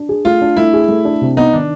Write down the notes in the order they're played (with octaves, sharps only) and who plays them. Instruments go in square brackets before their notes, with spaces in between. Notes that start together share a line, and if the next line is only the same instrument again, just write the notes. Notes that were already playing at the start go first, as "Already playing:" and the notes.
Already playing: [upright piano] D4
G#4
[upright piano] A3 [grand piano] F4
[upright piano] D4
[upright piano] A3 [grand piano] E4
[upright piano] G#4
A3
D4
C3
[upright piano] B3 [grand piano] D#4
[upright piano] D#3 [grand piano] D4